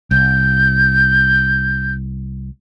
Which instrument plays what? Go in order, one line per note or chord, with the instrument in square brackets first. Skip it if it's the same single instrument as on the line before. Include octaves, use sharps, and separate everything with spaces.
[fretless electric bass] C2 [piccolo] G6